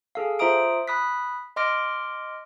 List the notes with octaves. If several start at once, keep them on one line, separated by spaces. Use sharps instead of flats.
G#4 A4 F5
F4 C5 E5 A#5 D#6 D7
B5 D#6 F#6 B6
D#5 C6 D6 F6 A#6 D7